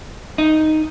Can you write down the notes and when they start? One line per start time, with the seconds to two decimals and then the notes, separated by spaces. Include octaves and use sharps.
0.38 D#4